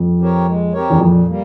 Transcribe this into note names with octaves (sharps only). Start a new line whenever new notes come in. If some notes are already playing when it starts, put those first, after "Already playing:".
Already playing: F2
C4 G4 A#4 C#5
G#3
C4 G4 A#4 C#5
E2
F2 A#2
G3 A#3